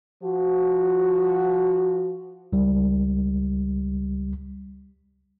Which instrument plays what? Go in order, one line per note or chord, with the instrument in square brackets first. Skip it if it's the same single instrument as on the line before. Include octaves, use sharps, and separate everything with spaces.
[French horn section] F3 F#4
[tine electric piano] C#2 G3